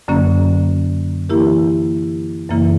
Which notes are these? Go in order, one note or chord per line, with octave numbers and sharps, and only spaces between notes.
F#2 D3 F#3 A#3 C#4
E3 A#3 E4 G4 A#4
F#2 C#3 E3 A#3 E4